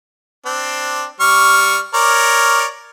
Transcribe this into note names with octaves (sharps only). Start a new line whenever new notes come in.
C4 D4
G3 C#6 F6
A#4 C#5 D5